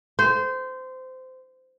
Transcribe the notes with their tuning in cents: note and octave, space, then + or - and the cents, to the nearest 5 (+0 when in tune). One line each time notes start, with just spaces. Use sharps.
C5 -20